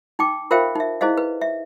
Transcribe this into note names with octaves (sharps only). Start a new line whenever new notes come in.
D#4 G5 D6
F4 A#4 C5 E5 F5 G5
D#4 E5
E4 G#4 C5 D#5 F5
B4
E5